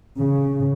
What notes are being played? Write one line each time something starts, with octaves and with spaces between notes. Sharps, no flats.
C#3